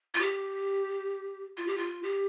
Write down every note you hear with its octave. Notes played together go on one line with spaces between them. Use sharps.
F4
G4
F4
G4
F4
G4